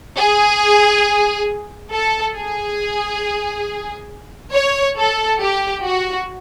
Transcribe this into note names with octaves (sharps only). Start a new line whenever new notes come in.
G#4
A4
G#4
C#5
A4
G4
F#4